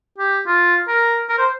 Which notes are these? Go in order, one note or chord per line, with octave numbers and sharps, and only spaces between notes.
G4
F4
A#4
A#4
C5